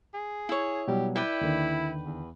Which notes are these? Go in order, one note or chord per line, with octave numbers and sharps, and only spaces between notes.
G#4
E4 C#5
B2 F#3 G3 G4
E4 B4 D5 G5
D#2 D3 D#3
E2